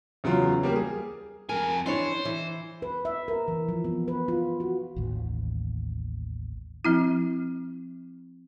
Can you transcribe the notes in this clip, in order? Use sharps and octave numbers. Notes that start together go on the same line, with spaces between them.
E2 C#3 F#3 F4
G3 A#3 A#4
G#4
F2 A#4 G#5
E3 D4 C5 C#5
E3
B4
E5
A#4
E3
F3
B3
B4
F4
F#4
A1 D#2
F3 C4 E4